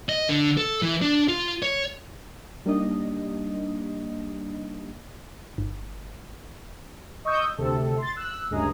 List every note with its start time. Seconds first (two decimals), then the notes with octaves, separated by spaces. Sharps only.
0.09 D#5
0.29 D3
0.57 A4
0.82 E3
1.02 D4
1.28 F4
1.63 C#5
2.66 G3 A#3 D4 D#4 D#5
5.58 G1
7.25 D#5 C#6 D#6 E6 G6
7.58 D2 C3 A4
7.98 C6 A6
8.16 E6 F#6
8.51 D2 G2 C#3 G#3 G#4 A#5